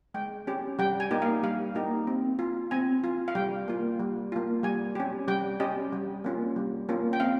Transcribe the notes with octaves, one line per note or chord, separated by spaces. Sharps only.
G#3 G5
C#4 G4
G3 G5
G#5
A#3 D#4 G4
F5
G3 F5
A#3 D#4 G4
C4
F4
C4 G#5
F4
F5
G3 G5
A#3 F4
G3
A#3 F4
G3 G#5
C#4 G4
G3 G5
C#4 G4 D#5
G3
A#3 C#4 F4
G3
A#3 C#4 F4
G5
C4 F5